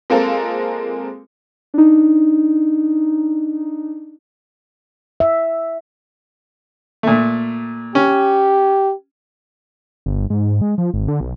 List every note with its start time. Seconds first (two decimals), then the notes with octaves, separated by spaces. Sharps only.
0.10 G#3 A#3 C4 F4 A4 A#4
1.74 D4 D#4
5.20 E5
7.03 A#2 A3
7.95 C#4 G4
10.06 G1
10.30 G#2
10.61 G#3
10.78 F3
10.94 G#1
11.08 D3
11.21 B1